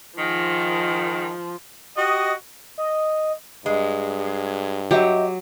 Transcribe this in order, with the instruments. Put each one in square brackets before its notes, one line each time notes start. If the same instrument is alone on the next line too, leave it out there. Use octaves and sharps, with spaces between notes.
[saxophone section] G#2 D#3 [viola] F3
[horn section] F#4 G4 D#5
[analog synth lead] D#5
[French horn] G2 [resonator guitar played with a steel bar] G#3
[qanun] F#3 [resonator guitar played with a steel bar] G4 E5 [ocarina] D#5